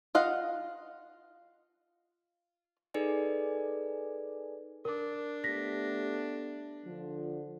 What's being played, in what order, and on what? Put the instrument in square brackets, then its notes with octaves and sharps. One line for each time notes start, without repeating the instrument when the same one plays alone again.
[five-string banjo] F4 D#5 F5 F#5
[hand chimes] D#4 G#4 A4 B4 D5 G#5
[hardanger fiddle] D4 [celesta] A#4 D6
[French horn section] A3 B3 G4 [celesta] A#6 B6
[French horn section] D3 F3